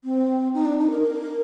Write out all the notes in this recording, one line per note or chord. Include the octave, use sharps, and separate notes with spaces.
C4
D#4
D4
D#4
A#4